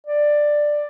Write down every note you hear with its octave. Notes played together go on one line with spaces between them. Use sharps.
D5